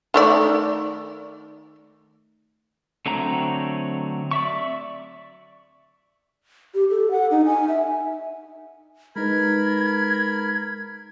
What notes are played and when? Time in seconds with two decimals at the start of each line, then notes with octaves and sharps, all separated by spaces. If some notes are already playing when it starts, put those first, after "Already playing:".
0.14 D#3 A3 D5
3.06 D3 F#3 A3 C4 A#5
4.31 D5 E5 C#6
6.74 G4
6.90 A4
7.11 F#5
7.31 D#4
7.45 G#5
7.68 E5
9.16 G#3 D#4 A#4 B4 B5 G#6